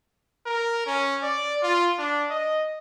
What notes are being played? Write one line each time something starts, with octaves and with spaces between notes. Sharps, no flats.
A#4
C#4
D5
F4
D4
D#5